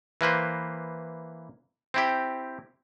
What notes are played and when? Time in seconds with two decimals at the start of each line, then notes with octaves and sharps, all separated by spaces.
0.21 E3 A#3 B4 C5
1.94 C4 E4 G4